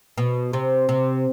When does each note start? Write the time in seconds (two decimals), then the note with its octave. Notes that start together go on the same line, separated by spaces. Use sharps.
0.18 B2
0.53 C3
0.89 C3